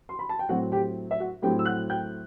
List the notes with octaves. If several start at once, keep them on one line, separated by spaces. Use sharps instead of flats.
C6
B5
A5
G5
A2 F#3 C4 F#4 F#5
G4 G5
E5
F#4 F#5
A2 F#3 C4 G4 G5
E6
F#5 F#6
G5 G6